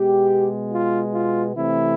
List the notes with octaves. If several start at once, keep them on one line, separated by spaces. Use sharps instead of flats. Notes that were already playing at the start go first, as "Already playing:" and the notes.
Already playing: B2 G#3 B3 G4
F4
F4
C3 E3 A3 C4 E4